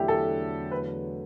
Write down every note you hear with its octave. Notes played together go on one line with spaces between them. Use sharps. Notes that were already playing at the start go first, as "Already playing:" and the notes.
Already playing: E2 D3 F#3 A3 D4 E4 G4
A4
B4